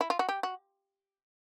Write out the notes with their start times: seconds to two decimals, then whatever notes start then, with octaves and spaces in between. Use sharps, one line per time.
0.01 E4
0.10 F4
0.19 F#4
0.29 G4
0.43 F#4